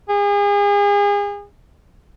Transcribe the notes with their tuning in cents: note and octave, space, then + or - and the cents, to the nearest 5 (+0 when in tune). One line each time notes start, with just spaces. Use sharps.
G#4 -35